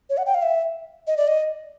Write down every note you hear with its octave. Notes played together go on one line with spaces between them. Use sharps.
C#5
F#5
G5
F5
E5
D#5
D5
D#5